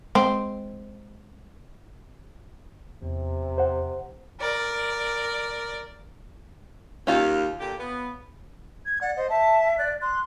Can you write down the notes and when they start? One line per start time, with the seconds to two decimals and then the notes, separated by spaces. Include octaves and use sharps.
0.15 G#3 C4
3.02 E2 C3
3.58 C5 F#5
4.40 A#4 D5
7.07 D#2 C#4 F4
7.60 A#2 D3 G4
7.78 B3
8.85 G#6
9.01 D5 F#5
9.16 C5 D#5
9.30 E5 A5
9.78 D5 F#6
10.01 C6 F#6